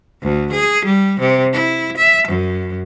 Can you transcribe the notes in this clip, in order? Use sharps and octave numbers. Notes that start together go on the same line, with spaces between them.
D2
G#4
G3
C3
E4
E5
F#2